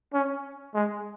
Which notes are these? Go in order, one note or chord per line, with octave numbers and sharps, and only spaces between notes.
C#4
G#3